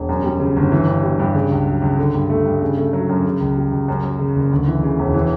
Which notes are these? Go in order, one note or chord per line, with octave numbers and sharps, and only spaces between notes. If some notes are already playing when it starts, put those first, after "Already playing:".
Already playing: E1
F#2
G3
C#3
G1
E3
G2
G3
G2
C#3
C#2
F#3
C#2
D3
G2
A3
G2
C#3
A3
F#3
F#2
C#3
C#2
G3
C#2
F#2
F#3
C#3
F#1
D2
E3
C#3
E1
E3